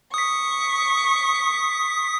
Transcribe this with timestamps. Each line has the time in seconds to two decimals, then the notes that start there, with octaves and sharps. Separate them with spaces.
0.14 C#6 D#6 B6